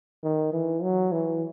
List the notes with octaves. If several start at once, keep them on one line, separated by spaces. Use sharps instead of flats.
D#3
E3
F#3
E3